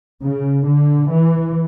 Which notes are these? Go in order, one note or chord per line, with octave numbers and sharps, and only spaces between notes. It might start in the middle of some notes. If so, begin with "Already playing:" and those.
C#3
D3
E3